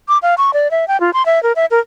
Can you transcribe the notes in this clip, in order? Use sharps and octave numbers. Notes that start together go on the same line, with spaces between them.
D6
F5
C#6
D5
E5
G5
F4
C6
E5
A#4
E5
A#4